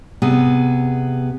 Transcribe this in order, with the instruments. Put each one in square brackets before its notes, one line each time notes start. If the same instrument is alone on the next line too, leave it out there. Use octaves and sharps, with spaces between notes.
[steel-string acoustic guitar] C3 B3 G#4